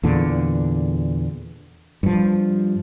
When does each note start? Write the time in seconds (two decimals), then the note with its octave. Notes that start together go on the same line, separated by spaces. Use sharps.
0.03 E2 A#2 D3
2.03 G2 F3